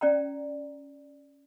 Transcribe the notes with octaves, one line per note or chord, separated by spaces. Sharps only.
C#4 D5 G5 A#5